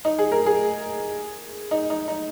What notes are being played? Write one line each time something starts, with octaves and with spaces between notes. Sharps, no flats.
D#4
G#4
A#4
G#4
D#4
D#4
D#4